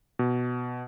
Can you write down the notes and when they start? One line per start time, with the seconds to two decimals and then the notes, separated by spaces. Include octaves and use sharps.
0.19 B2